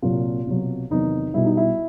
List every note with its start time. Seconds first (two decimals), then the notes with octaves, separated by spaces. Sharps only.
0.02 C2 A#2 F#3 F4
0.47 C2 B2 F#3
0.90 E2 C3 D#3 F#3 D#4
1.34 B1 B2 G3 E4
1.46 D#4
1.57 E4